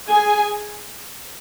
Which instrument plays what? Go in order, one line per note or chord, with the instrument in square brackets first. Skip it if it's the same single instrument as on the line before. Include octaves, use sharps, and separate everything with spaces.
[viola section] G#4 G#5